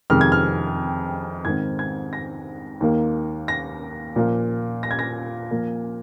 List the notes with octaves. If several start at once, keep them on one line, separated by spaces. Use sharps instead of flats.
F2 C3 D#3 G#3 F6
G#6
F6
G#2 D#3 C4 G#6
G#6
A#6
D#2 D#3 A#3
A#6
A#2 F3 A#3
A#6
G#6
A#6
A#2 F3 A#3